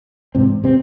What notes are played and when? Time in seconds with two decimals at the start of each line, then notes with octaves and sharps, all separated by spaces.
0.35 G#2 C3 E3 G#3 C4 D4
0.64 C3 C4